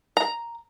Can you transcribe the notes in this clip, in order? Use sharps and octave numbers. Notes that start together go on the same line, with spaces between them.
A#5